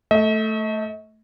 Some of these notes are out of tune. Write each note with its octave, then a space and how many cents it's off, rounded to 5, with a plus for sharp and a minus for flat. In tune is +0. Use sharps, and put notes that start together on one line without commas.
A3 +0 D#5 +45